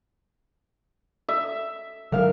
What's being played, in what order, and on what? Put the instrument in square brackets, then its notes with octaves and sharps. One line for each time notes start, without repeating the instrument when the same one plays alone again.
[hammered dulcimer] E5
[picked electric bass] D3 F#3 [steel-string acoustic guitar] A#4 F5